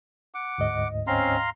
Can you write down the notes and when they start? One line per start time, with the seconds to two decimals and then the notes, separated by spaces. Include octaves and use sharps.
0.34 F#5 D6
0.58 D2 G#2 D#5
1.07 C4 C#4 F5 A#5 C6